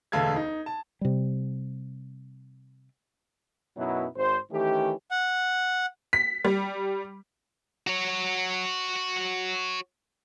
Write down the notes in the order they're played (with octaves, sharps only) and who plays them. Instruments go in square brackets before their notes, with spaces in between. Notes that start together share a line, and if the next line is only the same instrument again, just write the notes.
[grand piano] E1 D2 A4 F5 G#6
D#4
A5
[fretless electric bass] C3 G3
[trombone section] F#2 B2 F#3 B3 D#4 E4
G#1 C5
D#3 E3 A3 C#4 G4
[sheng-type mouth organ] F#5
[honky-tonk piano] B6
G3
[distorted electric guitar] F#4 C#5